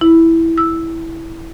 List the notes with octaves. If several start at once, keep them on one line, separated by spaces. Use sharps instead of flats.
E4
E6